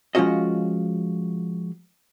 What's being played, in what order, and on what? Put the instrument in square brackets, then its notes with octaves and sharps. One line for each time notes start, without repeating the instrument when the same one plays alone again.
[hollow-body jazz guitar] F3 G#3 C#4 F4 F#4 D#5